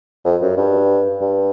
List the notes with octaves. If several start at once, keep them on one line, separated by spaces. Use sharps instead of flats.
F2
F#2
G2
G2